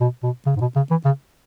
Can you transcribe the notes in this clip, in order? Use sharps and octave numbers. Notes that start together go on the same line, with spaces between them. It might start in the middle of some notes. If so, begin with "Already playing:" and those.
B2
B2
C#3
G#2
B2
C#3
E3
C#3